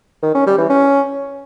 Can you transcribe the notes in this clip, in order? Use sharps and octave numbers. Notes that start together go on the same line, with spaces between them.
D#3
C#4
G3
E3
C#4